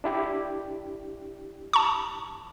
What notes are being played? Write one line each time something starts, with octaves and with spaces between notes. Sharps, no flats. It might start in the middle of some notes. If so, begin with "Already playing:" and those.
D4 E4 G4
A5 C#6